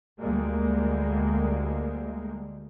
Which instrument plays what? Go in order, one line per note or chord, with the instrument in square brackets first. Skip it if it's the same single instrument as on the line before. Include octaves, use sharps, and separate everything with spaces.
[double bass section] D2 G3 G#3 A#3